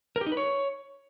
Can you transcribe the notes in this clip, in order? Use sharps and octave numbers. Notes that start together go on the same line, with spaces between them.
A#4
G4
D#4
B4
C#5